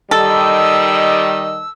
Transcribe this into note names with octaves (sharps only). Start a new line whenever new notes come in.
D#3 G3 A4 D#5 E6